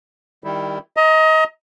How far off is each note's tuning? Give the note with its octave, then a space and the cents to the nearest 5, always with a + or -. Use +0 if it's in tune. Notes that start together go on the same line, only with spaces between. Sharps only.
D#3 +0 G3 +15 E4 +0
D#5 +25 A#5 -5